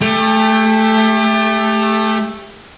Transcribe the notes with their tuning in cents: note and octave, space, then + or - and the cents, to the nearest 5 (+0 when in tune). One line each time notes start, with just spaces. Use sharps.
A3 -5 G4 +30